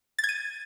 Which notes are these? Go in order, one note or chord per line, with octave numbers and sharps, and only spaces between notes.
A6
G#6
D#7